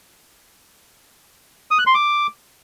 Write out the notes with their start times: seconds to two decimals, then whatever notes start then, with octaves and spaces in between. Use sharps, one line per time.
1.71 D#6
1.79 F#6
1.87 C6
1.94 D6